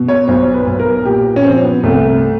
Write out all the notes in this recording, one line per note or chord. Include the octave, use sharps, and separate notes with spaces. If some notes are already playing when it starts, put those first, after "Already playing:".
Already playing: B2
C#5
B1 C5
B4
B1
A#4
A#2 G4
C#4
F3 C4
B3
C2 A3